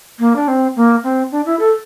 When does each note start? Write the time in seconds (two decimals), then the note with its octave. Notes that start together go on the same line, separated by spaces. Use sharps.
0.19 A#3
0.36 D4
0.48 C4
0.76 A#3
1.04 C4
1.32 D4
1.46 E4
1.59 A4